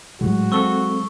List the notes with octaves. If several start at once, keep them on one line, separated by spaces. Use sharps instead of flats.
A2 F#3 G#3 F#4
C4 A4 C#6 E6 G7